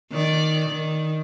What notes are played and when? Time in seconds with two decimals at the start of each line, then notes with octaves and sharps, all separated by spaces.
0.11 D#3 D5
0.69 D#3